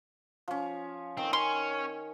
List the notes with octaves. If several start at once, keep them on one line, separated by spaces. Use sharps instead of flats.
F3 C#4
D#3 C4
C#4 C6